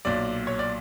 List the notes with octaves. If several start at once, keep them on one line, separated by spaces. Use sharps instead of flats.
B1 A#2 F#3 D5
C#5
D5